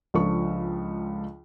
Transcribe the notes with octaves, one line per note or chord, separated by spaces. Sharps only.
C#2 F3 D4 A4 C#6